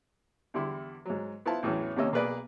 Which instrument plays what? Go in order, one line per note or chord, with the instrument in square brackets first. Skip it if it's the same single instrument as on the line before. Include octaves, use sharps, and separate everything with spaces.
[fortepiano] E2 D3 G3 E4 C6
G#2 F#3
B3 E4 F4 C5 A5
E2 A2 E3 F#3 C#4
D#2 C3 A#3 C#4 D#5 E6
B1 A#3 G#4 B4 D5